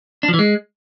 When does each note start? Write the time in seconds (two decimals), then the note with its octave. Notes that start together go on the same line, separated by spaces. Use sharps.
0.23 D4
0.28 F3
0.34 E3
0.39 G#3